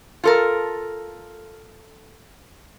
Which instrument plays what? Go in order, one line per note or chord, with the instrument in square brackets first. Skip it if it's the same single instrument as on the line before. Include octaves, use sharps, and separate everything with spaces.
[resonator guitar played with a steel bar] F4 A4 A#4